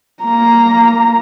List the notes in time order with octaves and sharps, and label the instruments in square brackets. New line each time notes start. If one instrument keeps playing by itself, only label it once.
[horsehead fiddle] A#3 A#5